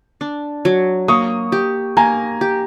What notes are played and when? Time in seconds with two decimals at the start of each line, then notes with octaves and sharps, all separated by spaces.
0.21 D4
0.65 F#3
1.08 A#3 C#6 D#6
1.52 G4
1.97 A#3 G#5 A#5
2.41 G4